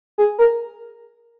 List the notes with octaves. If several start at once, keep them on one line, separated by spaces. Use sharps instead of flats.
G#4
A#4